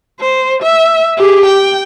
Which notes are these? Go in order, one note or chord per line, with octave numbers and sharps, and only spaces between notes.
C5
E5
G4 G#4
G5